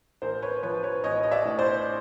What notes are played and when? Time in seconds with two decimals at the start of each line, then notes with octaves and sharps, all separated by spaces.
0.22 A1 A#4 C5
0.42 B4 C#5
0.63 F3 B4 C#5
0.83 B4 C#5
1.04 A1 C#5 D#5
1.23 D#5
1.31 D5 E5
1.45 A2
1.59 C5 D5